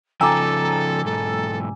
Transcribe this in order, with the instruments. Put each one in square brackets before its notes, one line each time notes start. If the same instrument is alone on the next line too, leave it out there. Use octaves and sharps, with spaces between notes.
[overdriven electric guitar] C#3 F3 [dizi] A4 [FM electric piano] G5 A#5 E6 [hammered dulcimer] G#5 D6
[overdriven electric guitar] B1 G#2 [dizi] A4